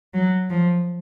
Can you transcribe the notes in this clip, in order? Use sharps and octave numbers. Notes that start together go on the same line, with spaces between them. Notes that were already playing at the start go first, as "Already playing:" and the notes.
F#3
F3